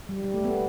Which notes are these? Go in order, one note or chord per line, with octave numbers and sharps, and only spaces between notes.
G3
G3
A3
B3